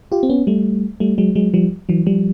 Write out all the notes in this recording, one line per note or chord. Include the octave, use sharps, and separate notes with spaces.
F4 G4
C4
B3 C#4
G3 A3
G3 A3
F#3 G#3
F#3 G#3
F3 G3
E3 F#3
F3 G3